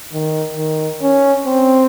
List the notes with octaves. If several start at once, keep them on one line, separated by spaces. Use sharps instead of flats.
D#3
D#3
C#4
C4